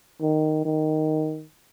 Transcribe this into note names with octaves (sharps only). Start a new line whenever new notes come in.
D#3
D#3